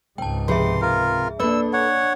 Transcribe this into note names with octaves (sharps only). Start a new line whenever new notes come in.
C#2 G#2 C4 G5 A5
C3 F3 G#4 B4 E5 C6
F4 A#4
A#3 D4 A4 B4 D5 E6
C#5 F#5